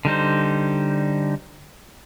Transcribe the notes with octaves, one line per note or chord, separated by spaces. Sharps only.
D3 G3 D#4 C5